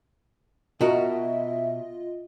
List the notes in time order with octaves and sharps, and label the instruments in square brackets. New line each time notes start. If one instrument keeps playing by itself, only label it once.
[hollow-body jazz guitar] B2 F#4 A#4 [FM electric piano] F4 D#5 [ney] E5